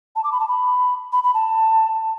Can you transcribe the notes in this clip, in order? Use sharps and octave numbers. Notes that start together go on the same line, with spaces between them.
A5
D6
B5
A5
B5
B5
B5
A5